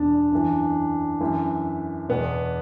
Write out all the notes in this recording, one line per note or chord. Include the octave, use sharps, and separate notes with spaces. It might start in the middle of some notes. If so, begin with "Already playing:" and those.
Already playing: E2 B2 D4
F#2 E3
F#2 E3
E2 B2 B3